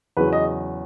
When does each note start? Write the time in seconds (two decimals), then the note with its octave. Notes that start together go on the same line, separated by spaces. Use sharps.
0.17 E2 C#3 F#3 B4
0.33 D#5